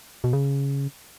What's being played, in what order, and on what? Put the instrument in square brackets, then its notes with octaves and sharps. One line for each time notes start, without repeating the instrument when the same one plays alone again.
[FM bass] B2
C#3